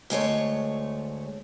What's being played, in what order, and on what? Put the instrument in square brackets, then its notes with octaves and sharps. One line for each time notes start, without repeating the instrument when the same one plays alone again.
[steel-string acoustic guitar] D2 G#3 A3 C#5